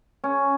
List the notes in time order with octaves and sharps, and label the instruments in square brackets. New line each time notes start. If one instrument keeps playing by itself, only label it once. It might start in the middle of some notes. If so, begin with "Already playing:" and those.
[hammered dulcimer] C#4